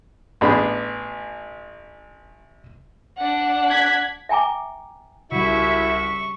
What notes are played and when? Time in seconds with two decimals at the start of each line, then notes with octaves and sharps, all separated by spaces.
0.41 A1 B3 D4 G#4 B5
3.16 D4 F#5
3.67 F#6 G#6 B6
4.29 E5 G5 G#5 A#5 D6
5.32 C2 C#3 G3 E4 F#4 E5 C#6